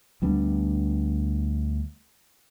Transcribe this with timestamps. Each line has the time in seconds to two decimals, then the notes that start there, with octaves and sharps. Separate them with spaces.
0.22 D2 G3 B3 D4